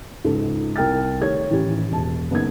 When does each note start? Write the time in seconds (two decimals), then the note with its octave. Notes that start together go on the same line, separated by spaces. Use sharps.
0.24 C#2 G#2 A4
0.76 C2 A#4 G5 F6 A6
1.21 D#3 A3 G4 C#5 G#6
1.49 A2 D#3 E3 C#4 D#4 G4
1.92 E1 A5
2.31 F#1 B3 D#4 G#6